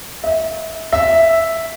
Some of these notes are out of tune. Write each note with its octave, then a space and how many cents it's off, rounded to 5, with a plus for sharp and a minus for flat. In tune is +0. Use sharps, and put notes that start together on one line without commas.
E5 -35
E5 -5